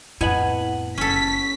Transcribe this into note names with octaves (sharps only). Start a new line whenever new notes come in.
F2 A2 B3 E4 D#5 G#5 F#7
F#1 C#4 A4 B6